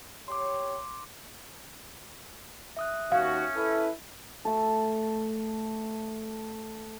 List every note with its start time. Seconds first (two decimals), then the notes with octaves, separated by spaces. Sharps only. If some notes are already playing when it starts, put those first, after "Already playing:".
0.28 G4 C#5 C6 D6
2.77 E5 D#6 F#6
3.12 D#2 C#4 F#4 F5
3.56 E4 A4 B4
4.45 A3 A4